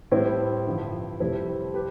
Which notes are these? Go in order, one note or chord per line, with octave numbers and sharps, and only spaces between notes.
A2 G3 C4 E4
G2 D3 F3
F2 C3 G3 C4 E4
G4 B4